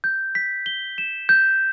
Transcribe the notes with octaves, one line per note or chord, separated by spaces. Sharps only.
G6
B6
G7
E7
G6